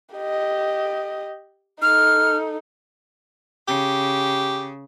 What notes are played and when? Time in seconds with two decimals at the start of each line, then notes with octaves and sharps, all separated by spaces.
0.15 G4 D#5
1.82 D#4 A4 F6
3.68 C#3 G4